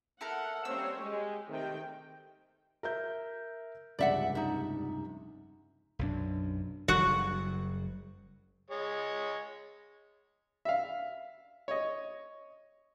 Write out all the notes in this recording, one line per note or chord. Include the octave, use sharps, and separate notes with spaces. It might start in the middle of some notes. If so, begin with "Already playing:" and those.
E4 A4 A#4 F#5
G3 A#3 C4 C#4 C5 C#5 E6
G#3 G4
C3 D#3 A3 G5
A#4 E5 G6
F1 C#2 G2 D5 E5 F#5
D#4 E5
B1 F#2 D4
F#1 F#3 G3 F#4 F#5
G#3 C#5
E5 F5
C#5 D#5